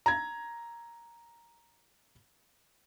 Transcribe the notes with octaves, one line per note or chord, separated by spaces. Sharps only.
A#5 G#6